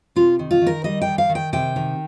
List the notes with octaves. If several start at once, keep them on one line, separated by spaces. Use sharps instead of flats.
C3 F4
D#3
F4
D#3
A#4
G3 D#5
G5
D#3
F5
D#3
G5
C3 G5
D#3